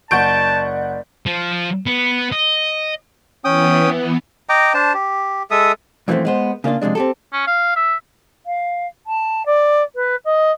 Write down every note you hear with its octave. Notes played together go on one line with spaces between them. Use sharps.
F#1 D5 F#5 A5 C#6 G6 D7
F3
B3
D#5
E3 B3 C#4 G5 D#6
D#5 G5 A#5 D6
D4 C5 A5
G4
G#3 A4 E5 D#6
F#2 E3 F3 G#3 A3 C4
G#3 B3 C5
C#3 A#3 D4 F4
F2 C3 G#3 D4
C4 G4 A4
C#4
F5
E5
F5
A5
D5
B4
D#5